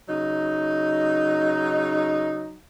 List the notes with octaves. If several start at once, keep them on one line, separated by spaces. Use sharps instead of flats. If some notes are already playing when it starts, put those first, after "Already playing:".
C#3 F#3 D#4